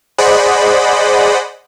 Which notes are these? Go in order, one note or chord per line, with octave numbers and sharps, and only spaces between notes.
G#4 C5 D5 D#5 F#5 B5